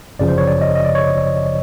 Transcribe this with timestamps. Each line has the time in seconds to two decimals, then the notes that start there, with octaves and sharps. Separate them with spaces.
0.19 G1 F#2 C#3 F3 D5
0.28 C5
0.38 C#5
0.47 D5
0.62 D#5
0.75 D#5
0.85 D5
0.95 C#5